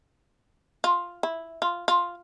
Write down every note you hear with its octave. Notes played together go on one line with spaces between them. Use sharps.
F4
E4
F4
F4